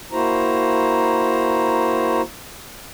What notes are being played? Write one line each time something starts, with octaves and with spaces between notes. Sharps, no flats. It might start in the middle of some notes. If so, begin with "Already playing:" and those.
A#3 E4 F#4 C5 A#5